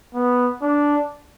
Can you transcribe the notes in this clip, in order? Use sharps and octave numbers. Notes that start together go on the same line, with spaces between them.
B3
D4